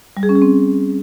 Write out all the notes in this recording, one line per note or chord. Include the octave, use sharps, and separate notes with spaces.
G3
G#4
C#4
G#4
C4